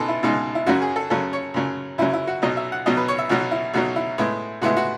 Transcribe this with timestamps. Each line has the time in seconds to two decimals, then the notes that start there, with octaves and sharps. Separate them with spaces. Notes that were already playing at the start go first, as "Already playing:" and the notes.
Already playing: C#2 B2 G#3 D#4 A4 B4
0.09 E4
0.23 C#2 B2 G#3 D#4
0.55 E4
0.66 F#2 C#3 F#3 F#4
0.82 G#4
0.96 A4
1.10 F#2 C#3 F#3 A4
1.33 C#5
1.54 F#2 C#3 F#3
1.98 F#2 C#3 F#3 E4
2.13 E4
2.27 F#4
2.42 B1 B2 F#3 D#5
2.57 E5
2.72 F#5
2.86 B1 B2 F#3 D#5
2.97 B4
3.08 C#5
3.18 E5
3.29 B1 B2 F#3 F#4
3.51 E4
3.74 B1 B2 F#3 F#4
3.96 E4
4.18 A2 G#3 B3 E4
4.62 A2 G#3 B3 E4 F#4
4.77 F#4